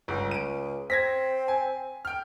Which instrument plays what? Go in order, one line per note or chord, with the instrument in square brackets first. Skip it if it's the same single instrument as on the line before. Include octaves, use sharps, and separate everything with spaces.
[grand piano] G1 [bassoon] C#2
[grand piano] D7 D#7
[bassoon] C4 [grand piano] G#6 A#6 B6
[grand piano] G#5
G5 F6